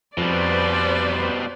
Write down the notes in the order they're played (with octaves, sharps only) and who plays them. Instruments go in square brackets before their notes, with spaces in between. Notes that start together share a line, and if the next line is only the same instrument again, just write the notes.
[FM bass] F2 [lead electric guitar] B2 G3 [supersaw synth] B4 C5 [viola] D5